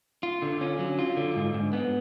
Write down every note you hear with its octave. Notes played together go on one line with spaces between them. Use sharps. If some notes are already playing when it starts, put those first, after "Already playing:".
F4
D3
C#4
F#3
F4
D3
G#2
G#2
B3